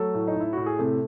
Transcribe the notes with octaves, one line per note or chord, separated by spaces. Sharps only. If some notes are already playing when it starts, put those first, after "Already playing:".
Already playing: F#3 A3 A4
A2
D#4
A2 E4
A2 F#4
G#4
C3 A3 A4